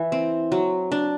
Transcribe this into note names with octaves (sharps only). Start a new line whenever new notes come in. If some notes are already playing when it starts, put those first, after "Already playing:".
Already playing: E3 E5
C4
F#3
D4